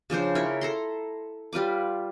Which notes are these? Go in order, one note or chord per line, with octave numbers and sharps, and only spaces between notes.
C#3 F3 D4 C5
E4 A#4 C#5
A4 A#5 C6
G3 F4 B4 D6